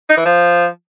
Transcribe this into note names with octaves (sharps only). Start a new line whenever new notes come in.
D#4
E3
F3